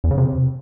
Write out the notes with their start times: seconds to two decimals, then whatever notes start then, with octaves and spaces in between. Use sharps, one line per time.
0.04 E2
0.11 C#3
0.18 C3